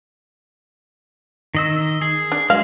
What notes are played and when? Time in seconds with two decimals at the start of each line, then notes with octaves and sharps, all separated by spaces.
1.55 D#3 D#5 E6
2.01 G#4
2.32 D4
2.50 F#3 G#3 F5